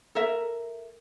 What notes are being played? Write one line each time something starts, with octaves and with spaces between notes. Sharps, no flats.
A4 A#4 E5